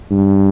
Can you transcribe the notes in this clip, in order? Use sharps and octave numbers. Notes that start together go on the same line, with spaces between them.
G2